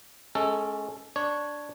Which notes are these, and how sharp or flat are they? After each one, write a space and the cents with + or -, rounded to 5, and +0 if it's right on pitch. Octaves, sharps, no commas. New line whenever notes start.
G#3 +30 C#4 +0 A4 +10
D4 +0 C#5 +0